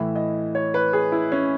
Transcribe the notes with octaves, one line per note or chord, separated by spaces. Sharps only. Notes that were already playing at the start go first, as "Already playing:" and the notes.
Already playing: A2 E3 E5
D#5
C#5
B4
G#4
E4
C#4